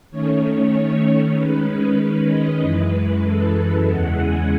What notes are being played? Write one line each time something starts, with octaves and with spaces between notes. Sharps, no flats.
D#3 A3 C#4 C#5
D#3 G#3 C#4 B4
B4
D#5
F#2 E3 G#3 B4
A4
E2 C#3 E3 G#3 F#5
G#5